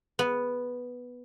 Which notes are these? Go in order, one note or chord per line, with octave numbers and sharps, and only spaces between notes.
B3